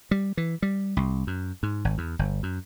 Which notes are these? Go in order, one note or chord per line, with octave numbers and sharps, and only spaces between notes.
G3
E3
G3
C2
F#2
G#2
G#1
E2
G1
F#2